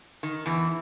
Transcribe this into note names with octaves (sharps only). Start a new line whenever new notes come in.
D#3
E2 E3